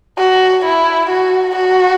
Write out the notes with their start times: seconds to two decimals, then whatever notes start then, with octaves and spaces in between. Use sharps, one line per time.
0.18 F#4
0.65 E4
1.10 F#4
1.56 F#4